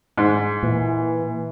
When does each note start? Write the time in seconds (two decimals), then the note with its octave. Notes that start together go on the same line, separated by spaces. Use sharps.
0.17 G#2
0.63 A#2 E3